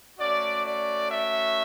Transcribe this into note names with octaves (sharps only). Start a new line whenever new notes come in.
A3 C#4 F#4 D5
D5
E5